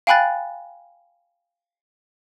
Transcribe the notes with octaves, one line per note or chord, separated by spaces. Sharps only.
F5 G5 G#5 B5 F#6 A6